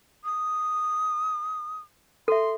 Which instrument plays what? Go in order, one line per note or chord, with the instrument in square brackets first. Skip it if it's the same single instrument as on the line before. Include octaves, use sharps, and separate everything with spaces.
[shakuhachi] D#6
[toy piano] A4 E5 [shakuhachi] C6